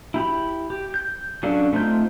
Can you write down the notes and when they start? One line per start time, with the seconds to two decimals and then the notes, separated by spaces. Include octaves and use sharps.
0.14 E4 G4 B5
0.70 G4
0.94 G6
1.43 F#3 C#4 D4 A4 F5
1.73 A3 C4 D#4 F4 G6